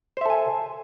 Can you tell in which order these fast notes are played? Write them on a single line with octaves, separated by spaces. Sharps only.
C5 E5 A4 G#5